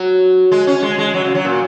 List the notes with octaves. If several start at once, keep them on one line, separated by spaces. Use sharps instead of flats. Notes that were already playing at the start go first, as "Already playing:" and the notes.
Already playing: F#3
G#3
C#4
G#3
G#3
F#3
C#3
F#3
A#2